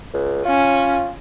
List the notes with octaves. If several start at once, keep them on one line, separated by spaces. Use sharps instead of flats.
C#2
C#4 F4